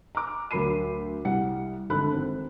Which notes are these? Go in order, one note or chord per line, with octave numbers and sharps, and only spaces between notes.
A#5 D6
D2 F#3 A#4 B5 C7 D#7
C2 G3 F#5 C#7
G#1 D3 A4 B5 F#6
G#1 C4